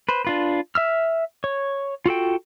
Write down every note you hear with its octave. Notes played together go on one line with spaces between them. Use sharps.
B4 C5
D4 F4 B4
E5 E6 F6
C#5
F4 F#4 A4 G5